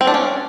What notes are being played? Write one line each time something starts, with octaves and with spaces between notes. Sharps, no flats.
C4
D4
C#4